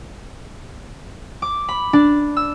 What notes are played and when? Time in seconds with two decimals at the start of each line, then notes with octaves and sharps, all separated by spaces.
1.42 D6
1.69 B5
1.93 D4
2.36 E6